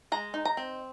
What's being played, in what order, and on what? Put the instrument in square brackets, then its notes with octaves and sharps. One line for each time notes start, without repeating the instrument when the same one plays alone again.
[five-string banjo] G#3 A#5
D#4
A#5
C4